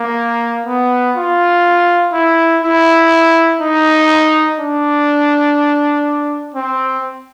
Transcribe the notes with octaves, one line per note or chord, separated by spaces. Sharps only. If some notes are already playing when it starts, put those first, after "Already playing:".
Already playing: A#3
B3
F4
E4
E4
D#4
D4
C4